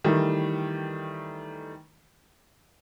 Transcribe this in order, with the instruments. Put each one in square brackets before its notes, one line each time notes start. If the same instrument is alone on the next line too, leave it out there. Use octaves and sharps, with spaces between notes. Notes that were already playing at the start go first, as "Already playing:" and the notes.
[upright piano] D#3 E3 G3 A3